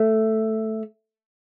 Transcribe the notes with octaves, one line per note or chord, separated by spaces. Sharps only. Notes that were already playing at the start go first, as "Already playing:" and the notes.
Already playing: A3